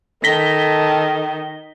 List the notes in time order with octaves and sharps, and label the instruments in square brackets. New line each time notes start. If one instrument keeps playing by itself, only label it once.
[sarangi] D#3 [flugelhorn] A4 [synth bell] A#6 B6 G7